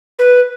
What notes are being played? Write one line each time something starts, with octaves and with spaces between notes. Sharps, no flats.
B4